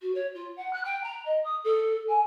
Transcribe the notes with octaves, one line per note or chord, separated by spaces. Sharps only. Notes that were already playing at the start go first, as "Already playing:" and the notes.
F#4
C#5
F4
F#5
F#6
G5
A#5
D#5
D#6
A4
G#5